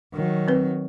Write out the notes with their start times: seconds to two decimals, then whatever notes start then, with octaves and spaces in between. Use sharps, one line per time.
0.13 D#3 F#3
0.48 C4 B4